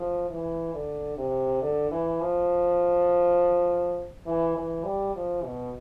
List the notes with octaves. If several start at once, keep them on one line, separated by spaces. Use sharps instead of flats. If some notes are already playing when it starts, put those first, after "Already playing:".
Already playing: F3
E3
D3
C3
D3
E3
F3
E3
E3
G3
F3
B2